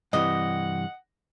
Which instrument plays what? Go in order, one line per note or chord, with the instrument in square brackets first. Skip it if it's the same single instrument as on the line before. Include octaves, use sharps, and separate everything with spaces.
[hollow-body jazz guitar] G2 C3 E3 [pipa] D#5 [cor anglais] F#5